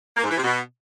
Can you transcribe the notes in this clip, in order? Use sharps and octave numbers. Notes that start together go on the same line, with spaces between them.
A#3
G#2
E3
C3
B2